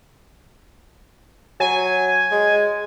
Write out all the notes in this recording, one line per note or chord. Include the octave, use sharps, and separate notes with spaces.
F#3 G#5
G#3